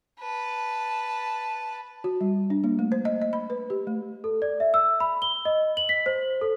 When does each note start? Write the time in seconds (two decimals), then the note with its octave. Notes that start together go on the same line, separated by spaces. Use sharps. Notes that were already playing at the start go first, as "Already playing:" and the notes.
0.20 B4 A5
2.04 F#4
2.21 G3
2.50 D4
2.64 A#3
2.79 A3
2.92 C5
3.05 D#5
3.22 D#5
3.33 B5
3.50 B4
3.70 G4
3.87 A3
4.24 A4
4.42 D5
4.60 E5
4.74 E6
5.00 B5
5.22 G7
5.45 D#5
5.77 F#7
5.89 B6
6.06 C5
6.41 A4